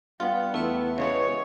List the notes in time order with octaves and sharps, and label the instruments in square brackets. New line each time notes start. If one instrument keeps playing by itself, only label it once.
[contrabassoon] G2 [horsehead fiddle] B3 [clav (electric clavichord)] F4 [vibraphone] G5
[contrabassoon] E2 [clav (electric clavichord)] A3 [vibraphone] E4 B4 E5
[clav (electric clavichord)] C#3 G#3 B3 [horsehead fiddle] C#5